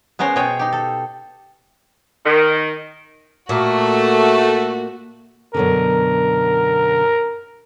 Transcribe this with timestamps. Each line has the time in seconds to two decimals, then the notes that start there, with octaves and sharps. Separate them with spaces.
0.19 G#3 B3 C#4 A#4 C5
0.36 B2 G#4 C5 C#5 G5
0.59 D#4 G4
0.73 A4
2.25 D#3
3.49 A#2 A3 A#3 F#4
5.54 F#2 B2 D3 A#4